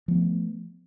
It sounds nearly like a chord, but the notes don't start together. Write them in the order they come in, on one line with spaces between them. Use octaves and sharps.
F3 B3 A3